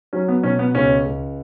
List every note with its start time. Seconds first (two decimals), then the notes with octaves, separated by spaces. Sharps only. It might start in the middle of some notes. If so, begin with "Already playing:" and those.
0.13 F#3 C#4
0.28 B3
0.43 B2 C#4
0.59 B3
0.75 C#2 C#4
1.06 C#2